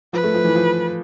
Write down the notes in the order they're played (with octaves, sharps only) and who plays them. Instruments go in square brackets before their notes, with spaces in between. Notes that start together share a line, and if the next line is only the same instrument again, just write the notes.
[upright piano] F3 [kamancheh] B4
[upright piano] A3
F3
E3
F3